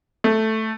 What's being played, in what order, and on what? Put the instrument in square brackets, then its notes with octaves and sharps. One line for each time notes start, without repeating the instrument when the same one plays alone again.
[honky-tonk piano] A3